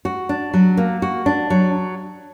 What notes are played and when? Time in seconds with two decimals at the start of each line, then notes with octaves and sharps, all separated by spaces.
0.05 F#4
0.29 D4
0.53 F#3
0.77 A#3
1.02 F#4
1.26 D4
1.50 F#3